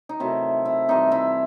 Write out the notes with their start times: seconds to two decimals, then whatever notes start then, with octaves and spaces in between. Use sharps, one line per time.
0.09 D#4
0.20 C3 D#3 F#3 A3 E4
0.65 E4
0.88 C3 E3 G3 D#4
1.12 E4